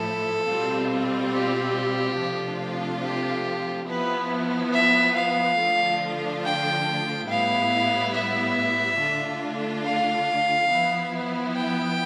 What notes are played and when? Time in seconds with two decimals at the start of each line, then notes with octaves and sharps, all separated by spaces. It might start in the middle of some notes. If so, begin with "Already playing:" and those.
Already playing: A2 F3 A3 E4 A4
0.47 B2 G3 C4 F4
1.33 G4
2.17 C3 F3 A3 D4 F4
3.02 G4
3.88 F3 B3 E4 B4
4.73 E5
5.15 F5
5.58 D3 F3 A3 D4 F4
6.44 G5
7.29 A2 G3 B3 E4 F5
8.14 E5
9.00 D3 A3 D4 F4
9.85 F5
10.70 F3 B3 E4
11.55 G5